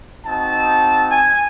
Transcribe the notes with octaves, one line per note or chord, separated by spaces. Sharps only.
C4 D#4 F#4 A5
G#5